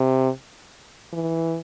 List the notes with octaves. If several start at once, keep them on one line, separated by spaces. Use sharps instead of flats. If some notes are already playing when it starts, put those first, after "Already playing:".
Already playing: C3
E3